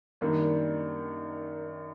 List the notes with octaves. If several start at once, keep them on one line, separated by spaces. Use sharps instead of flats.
F#2 D#3 G3 A#3 D4